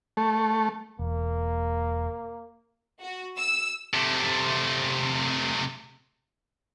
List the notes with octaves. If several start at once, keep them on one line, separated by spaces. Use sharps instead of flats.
A3
E1 A#3
F#4
E6
C3 A3